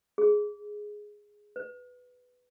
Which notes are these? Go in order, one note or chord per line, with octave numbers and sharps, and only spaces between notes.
G#4
B4